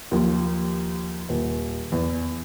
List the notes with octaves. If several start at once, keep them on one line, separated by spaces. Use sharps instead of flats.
D#2 F3
D#1
E2